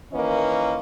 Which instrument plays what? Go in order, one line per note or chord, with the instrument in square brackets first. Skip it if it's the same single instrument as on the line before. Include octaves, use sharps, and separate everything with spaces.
[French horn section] D#3 E3 A#3 C#4 B4 D#5